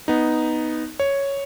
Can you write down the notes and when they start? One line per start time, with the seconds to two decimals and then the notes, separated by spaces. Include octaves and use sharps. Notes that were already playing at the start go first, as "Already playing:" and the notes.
0.08 B3 D#4
1.00 C#5